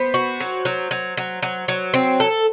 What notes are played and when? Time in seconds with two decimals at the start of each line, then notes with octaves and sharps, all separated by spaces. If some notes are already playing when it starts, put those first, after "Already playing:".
Already playing: B3 C5
0.14 F#4
0.40 F#3
0.65 F#3
0.91 F#3
1.17 F#3
1.42 F#3
1.68 F#3
1.94 C4
2.20 A4